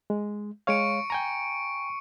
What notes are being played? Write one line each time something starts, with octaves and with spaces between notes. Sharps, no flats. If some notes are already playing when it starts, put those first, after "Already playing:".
G#3
G#3 C#5 F5 C#6 C#7 D7
G5 G#5 A#5